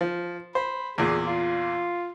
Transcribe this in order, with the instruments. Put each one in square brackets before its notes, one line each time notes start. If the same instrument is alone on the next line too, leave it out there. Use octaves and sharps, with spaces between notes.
[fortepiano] F3
[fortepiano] C5 [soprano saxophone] B5
[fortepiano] E2 A#2 [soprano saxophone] G#4
[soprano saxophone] F4